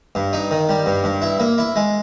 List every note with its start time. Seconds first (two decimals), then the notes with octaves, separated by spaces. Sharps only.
0.15 G2
0.33 D#4
0.51 D#3
0.69 G3
0.86 G2
1.04 G2
1.22 E4
1.40 A#3
1.58 E4
1.76 G#3